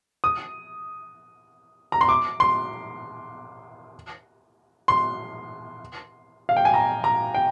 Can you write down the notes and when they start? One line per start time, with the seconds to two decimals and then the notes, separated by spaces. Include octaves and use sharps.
0.24 D#6
1.92 A#5
2.01 C6
2.09 D6
2.40 C6
4.88 C6
6.49 F5
6.57 G5
6.65 G#5
6.74 A#5
7.04 A#5
7.35 G5